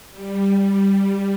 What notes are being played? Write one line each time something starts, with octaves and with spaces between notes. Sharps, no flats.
G3